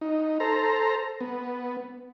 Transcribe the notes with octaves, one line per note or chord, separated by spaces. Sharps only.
D#4
A4 C5 A#5
B3